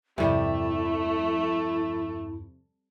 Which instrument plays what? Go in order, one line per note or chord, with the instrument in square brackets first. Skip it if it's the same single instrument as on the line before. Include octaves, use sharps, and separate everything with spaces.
[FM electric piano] E2 G2 F3 [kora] C3 G3 [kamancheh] A3 [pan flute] E4